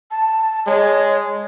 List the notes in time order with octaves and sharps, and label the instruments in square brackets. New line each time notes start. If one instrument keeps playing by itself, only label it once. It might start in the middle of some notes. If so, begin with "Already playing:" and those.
[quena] A5
[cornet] G#3 [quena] C#5